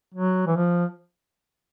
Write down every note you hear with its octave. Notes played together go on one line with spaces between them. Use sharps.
F#3
E3
F3